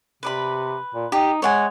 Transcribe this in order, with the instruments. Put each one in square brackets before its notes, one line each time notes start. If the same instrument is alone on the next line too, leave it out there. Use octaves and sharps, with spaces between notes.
[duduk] C3 [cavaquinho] B4 D5 B5
[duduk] A#2
[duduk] D#4 [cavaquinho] G4
[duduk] G#3 [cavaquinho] C#5 F#5 G#5